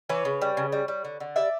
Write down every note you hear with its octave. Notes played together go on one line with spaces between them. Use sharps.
E3 B4 C#5
C#3
G3
C#3
G3
G3
D3
D3
G3 D5 E5